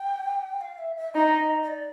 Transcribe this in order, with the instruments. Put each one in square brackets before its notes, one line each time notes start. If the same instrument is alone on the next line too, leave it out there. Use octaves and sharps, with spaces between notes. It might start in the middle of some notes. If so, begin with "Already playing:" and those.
Already playing: [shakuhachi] G5
F5
E5
E5
[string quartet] D#4 [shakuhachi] D#5
[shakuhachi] D#5
D5